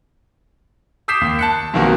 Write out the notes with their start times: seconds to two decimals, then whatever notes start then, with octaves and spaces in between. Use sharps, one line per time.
1.08 D6 D#6 G6 B6 C7 E7
1.21 D#2
1.39 A5 F#6 C#7
1.74 B1 C3 D#3 A#3 F#4 G4